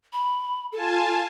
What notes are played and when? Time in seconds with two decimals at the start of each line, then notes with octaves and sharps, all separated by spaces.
0.13 B5
0.72 F4 A4 G#5 A5